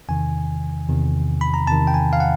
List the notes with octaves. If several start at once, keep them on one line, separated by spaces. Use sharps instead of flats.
E2 C3 D#3 G#5
E2 C3 D#3
B5
A#5
E2 C3 D#3 A5
G5
G#5
F5
F#5